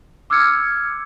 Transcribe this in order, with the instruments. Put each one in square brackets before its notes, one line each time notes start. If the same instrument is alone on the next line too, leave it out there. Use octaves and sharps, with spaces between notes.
[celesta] D6 E6 F6 G#6 C#7